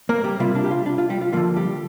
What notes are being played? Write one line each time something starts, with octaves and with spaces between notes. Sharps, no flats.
A#3 A#4
G3 G4
C3 G3 A#3 F4
D4
G4
F4
D4
F4
G3 G4
F4
D3 F3 A#3 F4
G3 G4